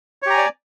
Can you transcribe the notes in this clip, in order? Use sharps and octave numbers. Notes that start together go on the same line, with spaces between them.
G4 C#5 D5 G#5 A#5